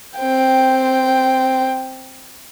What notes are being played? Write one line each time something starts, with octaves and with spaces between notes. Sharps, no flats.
C4 G5